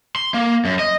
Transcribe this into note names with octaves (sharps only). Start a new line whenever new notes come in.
C6
A#3
F#2
D#5